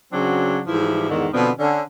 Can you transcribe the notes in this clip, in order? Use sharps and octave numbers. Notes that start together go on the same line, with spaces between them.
C#3 F#3 C4 D4 F#4
G#2 E3 F3 G3 E4
E2 G#2 D3 D#3
B2 D3 F3 B3 C4
D3 C#4